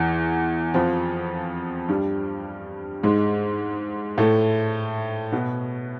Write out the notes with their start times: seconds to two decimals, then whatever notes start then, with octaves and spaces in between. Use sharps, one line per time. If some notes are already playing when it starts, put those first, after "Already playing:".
Already playing: E2 E3
0.74 F2 F3
1.89 G2 G3
3.03 G#2 G#3
4.18 A2 A3
5.32 B2 B3